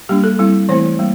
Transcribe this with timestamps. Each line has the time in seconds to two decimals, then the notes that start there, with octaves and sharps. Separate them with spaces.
0.09 G3 A#3 D4 G4
0.24 A4
0.39 G3 C4 E4
0.69 E3 A3 C4 E4 C5
0.99 G3 A#3